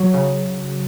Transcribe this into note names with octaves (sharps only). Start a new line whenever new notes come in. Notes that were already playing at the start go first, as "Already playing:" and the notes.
Already playing: F#3
C#3